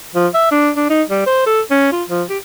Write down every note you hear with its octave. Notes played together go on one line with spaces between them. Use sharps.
F3
E5
D4
D4
D#4
G3
C5
A4
C#4
F4
F3
G4